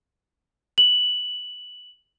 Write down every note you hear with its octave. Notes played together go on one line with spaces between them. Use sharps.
F#7